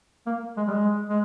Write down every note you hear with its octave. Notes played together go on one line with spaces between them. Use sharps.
A#3
G#3
G3
G#3
G#3